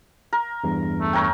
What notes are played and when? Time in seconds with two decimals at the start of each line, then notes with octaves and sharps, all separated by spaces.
0.33 A#4
0.64 E2 G2
1.00 A3
1.13 A#4 C#5 G5